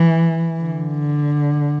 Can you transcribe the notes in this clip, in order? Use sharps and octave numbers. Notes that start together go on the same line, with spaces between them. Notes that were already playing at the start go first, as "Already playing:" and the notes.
Already playing: E3
D3